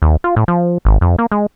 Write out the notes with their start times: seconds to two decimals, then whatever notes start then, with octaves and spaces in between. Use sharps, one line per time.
0.02 D#2
0.24 F4
0.36 A2
0.48 F3
0.85 G#1
1.01 F2
1.19 A#3
1.32 G#3